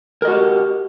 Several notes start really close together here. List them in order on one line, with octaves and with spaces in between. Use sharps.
A#4 D#5 F#4 G4